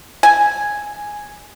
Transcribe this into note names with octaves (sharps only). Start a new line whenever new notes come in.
G#5